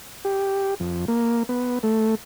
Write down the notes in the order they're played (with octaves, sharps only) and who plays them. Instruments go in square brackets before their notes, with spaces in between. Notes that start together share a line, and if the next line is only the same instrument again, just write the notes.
[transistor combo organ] G4
F2
A#3
B3
A3